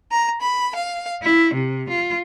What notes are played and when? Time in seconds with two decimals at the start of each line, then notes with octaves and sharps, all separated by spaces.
0.12 A#5
0.40 B5
0.75 F5
1.23 E4
1.54 C3
1.90 F4